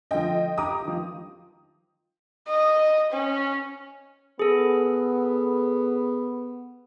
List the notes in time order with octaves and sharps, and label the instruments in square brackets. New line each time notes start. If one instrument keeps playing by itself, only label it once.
[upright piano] D3 F3 [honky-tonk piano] D#5 G5
[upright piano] G4 A#5 D6 [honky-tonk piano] D#6
[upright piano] D#3 F3
[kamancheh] D#5
C#4
[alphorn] B3 [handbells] G#4 A4